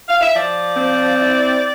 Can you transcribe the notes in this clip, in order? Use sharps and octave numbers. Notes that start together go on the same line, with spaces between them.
F5
E5
F3 D5
C4
E4